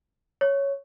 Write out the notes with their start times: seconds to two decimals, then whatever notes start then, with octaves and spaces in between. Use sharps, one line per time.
0.41 C#5